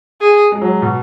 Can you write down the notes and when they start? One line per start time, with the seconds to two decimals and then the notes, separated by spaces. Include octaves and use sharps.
0.21 G#4
0.52 G#3
0.62 F#3
0.82 B2